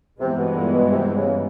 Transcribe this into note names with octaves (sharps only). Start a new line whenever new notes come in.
G2 C3 E3 G#3 B3
B2
A#2
B2
C3
C#3